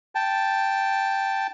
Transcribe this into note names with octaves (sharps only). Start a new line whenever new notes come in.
G5 A5